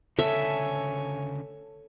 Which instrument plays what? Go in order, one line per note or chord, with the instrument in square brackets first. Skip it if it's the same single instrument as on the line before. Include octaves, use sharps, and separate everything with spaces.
[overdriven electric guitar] D2 C#3 [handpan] A4 [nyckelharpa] C#5 G#5 [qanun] E5